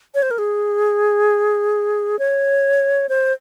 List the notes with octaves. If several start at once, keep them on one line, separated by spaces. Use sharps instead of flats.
C#5
C5
A#4
G#4
C#5
C5